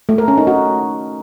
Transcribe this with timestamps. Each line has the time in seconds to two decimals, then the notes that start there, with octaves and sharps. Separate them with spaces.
0.09 A3
0.18 A#4
0.28 C#4
0.38 D#4
0.47 F#4